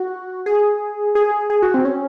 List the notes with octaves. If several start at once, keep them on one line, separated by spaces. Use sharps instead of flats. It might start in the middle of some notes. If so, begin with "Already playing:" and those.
Already playing: F#4
G#4
G#4
G#4
F#4
C4
C#4